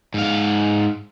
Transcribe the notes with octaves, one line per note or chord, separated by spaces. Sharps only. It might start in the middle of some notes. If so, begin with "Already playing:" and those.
G#2 F5